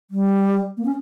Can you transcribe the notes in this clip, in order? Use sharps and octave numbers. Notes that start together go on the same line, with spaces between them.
G3
A#3
C#4